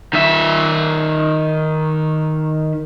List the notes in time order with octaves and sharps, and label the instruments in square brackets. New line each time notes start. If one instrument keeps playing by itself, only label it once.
[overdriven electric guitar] D#3 E5